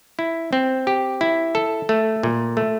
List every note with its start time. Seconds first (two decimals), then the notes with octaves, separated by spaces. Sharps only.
0.19 E4
0.53 C4
0.87 G4
1.21 E4
1.55 A4
1.89 A3
2.23 A#2
2.57 A3